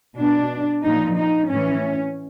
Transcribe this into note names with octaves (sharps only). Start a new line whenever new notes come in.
B2 D4
A#2 F3 D#4
D#4
A2 E3 C#4